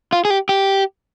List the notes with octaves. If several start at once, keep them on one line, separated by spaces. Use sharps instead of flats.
F4
G#4
G4
G4